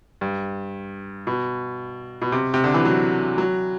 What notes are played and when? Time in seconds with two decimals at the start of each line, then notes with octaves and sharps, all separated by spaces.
0.21 G2
1.27 B2
2.22 B2
2.32 C3
2.54 C3
2.64 D3
2.74 E3
2.85 F#3
3.38 F#3